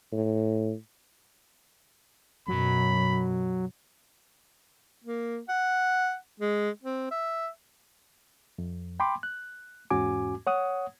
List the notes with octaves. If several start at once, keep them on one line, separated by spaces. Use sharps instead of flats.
A2
F#2 B2 F#3 B5
A#3
F#5
G#3
C4
E5
F2
G5 B5 C6 D6
F#6
E2 G#2 C#4 F#4 G#5 D6
C#5 F#5 D#6